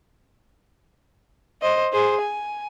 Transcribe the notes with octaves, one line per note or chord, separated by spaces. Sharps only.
C5 D#5
G#4 C5
G#5